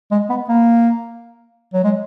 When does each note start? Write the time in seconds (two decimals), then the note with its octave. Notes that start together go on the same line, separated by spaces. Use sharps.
0.11 G#3
0.29 B3
0.49 A#3
1.74 F#3
1.84 G#3